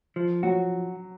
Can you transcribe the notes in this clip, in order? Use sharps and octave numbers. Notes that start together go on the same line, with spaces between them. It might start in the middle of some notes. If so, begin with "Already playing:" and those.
F3
F#3 F#4